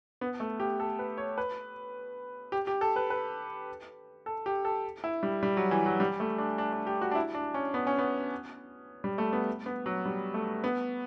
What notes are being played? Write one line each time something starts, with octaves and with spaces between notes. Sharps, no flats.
B3
A3
G4
A4
B4
C#5
B4
G4
G4
A4
B4
B4
A4
G4
A4
E4
G3
G3
F#3
E3
F#3
G3
A3
D4
D4
D4
G4
F#4
D4
E4
D4
C#4
B3
C#4
B3
G3
A3
B3
B3
F#3
G3
A3
B3